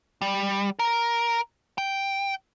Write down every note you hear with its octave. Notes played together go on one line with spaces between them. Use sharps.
G3
A#4
G5